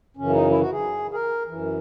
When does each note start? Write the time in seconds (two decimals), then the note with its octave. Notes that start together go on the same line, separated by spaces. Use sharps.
0.17 F#2 C#3 E3 C#4
0.33 D#4
0.50 E4
0.60 F#4
0.71 G#4
1.11 G#4
1.14 A#4
1.47 F#2 E3